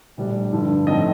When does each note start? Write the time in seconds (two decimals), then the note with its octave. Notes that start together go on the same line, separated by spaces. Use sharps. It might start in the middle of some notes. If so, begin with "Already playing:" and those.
0.17 A#1 A2 G3 D4
0.52 G1 G2 D3 F3
0.87 A2 F3 C4 D#4 D#5